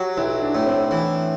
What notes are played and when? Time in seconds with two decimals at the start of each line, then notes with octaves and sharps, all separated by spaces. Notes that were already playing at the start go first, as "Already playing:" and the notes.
Already playing: F#3 F#4 G4
0.17 B1 E4
0.42 D4
0.55 A2
0.67 C4
0.91 E3